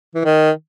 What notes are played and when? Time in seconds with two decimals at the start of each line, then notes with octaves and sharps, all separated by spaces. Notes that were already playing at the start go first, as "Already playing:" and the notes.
0.15 E3
0.25 D#3